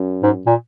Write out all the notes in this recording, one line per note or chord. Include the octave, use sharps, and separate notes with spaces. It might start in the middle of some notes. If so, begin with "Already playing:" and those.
Already playing: F#2
G#2
A#2